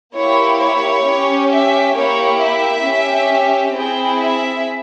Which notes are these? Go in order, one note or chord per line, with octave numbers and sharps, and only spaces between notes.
A#3 E4 G4 C#5
C#5
C#4 G4
E5
A#3 E4 G4 C#5
E5
C#4 G4
C4 E4 G#4 G5
E5